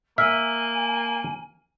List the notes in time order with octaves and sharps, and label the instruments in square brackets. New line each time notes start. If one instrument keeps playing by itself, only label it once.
[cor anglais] A#3 [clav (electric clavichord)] E5 [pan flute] G#5 [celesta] F6